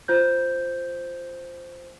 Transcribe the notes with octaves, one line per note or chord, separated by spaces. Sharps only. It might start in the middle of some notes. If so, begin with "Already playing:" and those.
F4 C5 G6